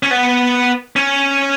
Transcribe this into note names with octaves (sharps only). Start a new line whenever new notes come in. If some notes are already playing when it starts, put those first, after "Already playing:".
C#4
B3
C#4